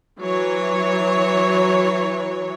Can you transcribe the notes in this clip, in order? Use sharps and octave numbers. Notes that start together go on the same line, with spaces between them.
E3 F#3 C#5